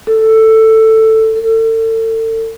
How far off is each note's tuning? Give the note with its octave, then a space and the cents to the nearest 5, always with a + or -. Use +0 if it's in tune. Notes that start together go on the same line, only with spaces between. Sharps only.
A4 +10
A4 +35